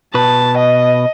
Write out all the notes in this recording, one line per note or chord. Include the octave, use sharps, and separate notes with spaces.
B2 B4 A5
D#5